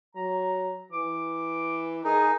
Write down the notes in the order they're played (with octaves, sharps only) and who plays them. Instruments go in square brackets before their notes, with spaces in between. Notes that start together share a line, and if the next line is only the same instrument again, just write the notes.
[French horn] F#3 [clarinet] A#5
[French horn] E3 [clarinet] D6
[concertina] D#4 [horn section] G#4 [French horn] A#4